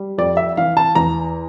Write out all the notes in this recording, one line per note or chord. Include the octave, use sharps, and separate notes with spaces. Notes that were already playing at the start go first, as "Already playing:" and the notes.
Already playing: G3
F2 D5
E5
E3 F5
A5
E2 A#5